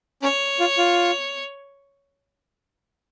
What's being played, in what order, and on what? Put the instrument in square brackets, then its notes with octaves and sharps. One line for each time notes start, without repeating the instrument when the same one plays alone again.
[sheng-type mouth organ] C#4 [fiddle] C#5
[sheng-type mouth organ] F4
F4